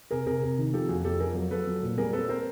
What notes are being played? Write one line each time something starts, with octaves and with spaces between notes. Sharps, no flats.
C3 G#4 A#4
C3 G#4 A#4
C3
D#3
F3 G4 A4
F2 F#4 G#4
F2 G4 A4
F3 G#4 A#4
F#3
F#3 A4 B4
F#3
A#2
G3 G#4 A#4
C4 A4 B4
C4 A#4 C5